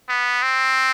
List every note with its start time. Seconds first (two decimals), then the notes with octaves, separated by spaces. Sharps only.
0.09 B3
0.42 C4